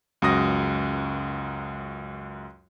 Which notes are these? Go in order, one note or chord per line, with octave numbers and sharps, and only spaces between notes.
C#2 F#2 F#4 D#6 A#6